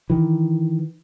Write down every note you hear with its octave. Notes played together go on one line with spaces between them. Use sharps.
D#3 E3